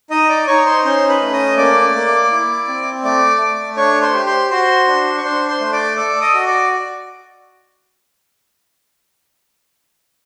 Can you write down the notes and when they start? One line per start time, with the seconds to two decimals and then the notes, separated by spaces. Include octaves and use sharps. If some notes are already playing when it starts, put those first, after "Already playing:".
0.10 D#4 D#5 D#6
0.29 D5 D6
0.47 D#4 C#5 C#6
0.66 C5 C6
0.84 C#4 C5 C6
1.08 B4 B5
1.21 A3
1.33 D#5 D#6
1.57 A#3 D5 D6
1.94 A#3
2.31 E4
2.68 C4
3.04 A3 D5 D6
3.41 A3
3.77 D4 C#5 C#6
4.02 C5 C6
4.14 G4
4.26 C5 C6
4.50 F#4 C5 C6
4.87 D4
5.18 C#6
5.23 D4 C5 C6
5.48 C5 C6
5.60 A3
5.73 D5 D6
5.97 A4 D5 D6
6.21 D#5 D#6
6.34 F#4
6.46 D5 D6